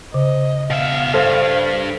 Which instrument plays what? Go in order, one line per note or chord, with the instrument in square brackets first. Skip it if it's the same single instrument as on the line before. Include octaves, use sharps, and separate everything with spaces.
[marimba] C#3 [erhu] D#5
[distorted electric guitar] B2 E5 [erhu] F5
[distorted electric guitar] G2 [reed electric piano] A4 C5